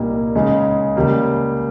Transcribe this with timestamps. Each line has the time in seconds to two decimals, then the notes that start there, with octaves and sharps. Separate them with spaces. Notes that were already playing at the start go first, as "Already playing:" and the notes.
Already playing: C2 A#2 G3 A#3 D#4
0.35 C#2 C#3 G#3 D#4
0.96 C#2 C#3 G3 A#3